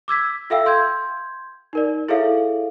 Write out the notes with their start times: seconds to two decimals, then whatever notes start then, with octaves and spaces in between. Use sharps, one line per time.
0.08 D6 E6 G#6 B6
0.50 F4 A4 E5 F5 G5 E6
0.66 C6 G6 G#6
1.73 D#4 A#4 D5
2.08 E4 G#4 A4 C#5 E5 F5